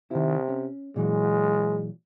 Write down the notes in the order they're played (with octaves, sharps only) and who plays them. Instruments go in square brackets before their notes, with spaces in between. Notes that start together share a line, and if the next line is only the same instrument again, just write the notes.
[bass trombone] C3 [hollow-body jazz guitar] D#3 E4
[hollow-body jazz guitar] C#4
[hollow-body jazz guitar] A#2 E3 F#3 [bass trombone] G#3